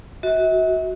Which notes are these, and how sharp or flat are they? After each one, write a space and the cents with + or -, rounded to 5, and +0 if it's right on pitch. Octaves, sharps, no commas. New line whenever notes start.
F#4 +0 E5 -45